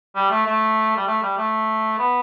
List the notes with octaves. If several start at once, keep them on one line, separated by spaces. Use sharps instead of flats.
G3
A3
A3
G3
A3
G3
A3
B3